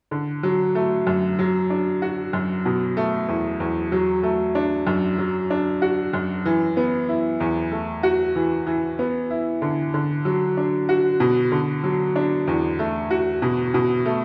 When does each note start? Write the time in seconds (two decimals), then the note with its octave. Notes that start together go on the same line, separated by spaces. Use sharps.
0.11 D3
0.43 F#3
0.75 A3
1.07 F#2
1.39 F#3
1.70 D4
2.02 F#4
2.33 F#2
2.65 B2
2.97 A3
3.28 E2
3.60 E2
3.92 F#3
4.23 A3
4.55 D4
4.87 F#2
5.18 F#3
5.50 D4
5.82 F#4
6.13 F#2
6.45 E3
6.77 B3
7.09 E4
7.40 E2
7.72 A3
8.03 F#4
8.36 E3
8.67 E3
8.99 B3
9.30 E4
9.62 D3
9.94 D3
10.25 F#3
10.57 D4
10.89 F#4
11.20 B2
11.52 D3
11.83 F#3
12.16 D4
12.47 E2
12.79 A3
13.10 F#4
13.42 B2
13.74 B2
14.05 A3